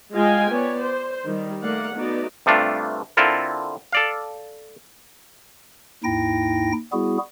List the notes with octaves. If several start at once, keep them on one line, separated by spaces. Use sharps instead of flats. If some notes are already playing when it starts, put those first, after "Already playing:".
G#3 F4 D#5 F5 G5 G#5
B3 C#5 D5
C5
D#3 G3
A3 A#3 D5 F5 F#5
A3 B3 D#4 F#4 D5
G2 C3 A3 D4 F4
D3 C4 E4 F4 A4 A#4
A4 D5 F5
D#2 G#2 D#4 E4 G5 A#6
G3 B3 E4 F#4 G#4